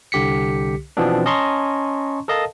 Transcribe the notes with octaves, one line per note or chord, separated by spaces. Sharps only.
C2 D3 G4 B6 C#7
B2 E3 F3 B3 C4 D4
C#4 D#5 A5 A#5 C6 C#6
A4 A#4 D#5 F5 A5